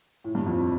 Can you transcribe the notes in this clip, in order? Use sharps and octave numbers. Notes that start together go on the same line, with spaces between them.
A2
G2
F2